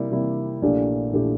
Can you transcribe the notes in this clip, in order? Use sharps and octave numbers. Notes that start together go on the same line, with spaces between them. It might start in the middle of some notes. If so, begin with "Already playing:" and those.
Already playing: C3 G3 A#3 E4
C3 G3 A#3 E4
A#1 A#2 A3 E4 G4
A#1 A#2 A3 E4 G4